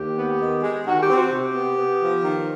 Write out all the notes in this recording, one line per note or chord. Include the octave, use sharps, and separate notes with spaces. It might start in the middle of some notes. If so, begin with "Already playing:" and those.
Already playing: D#2 G4
B3
D#3
G#3
D#3 F#4
G4
C4
F#4
C3 G4
B3
B3
F3
D#3